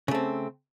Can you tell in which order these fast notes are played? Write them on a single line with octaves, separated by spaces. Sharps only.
C#3 A3 C4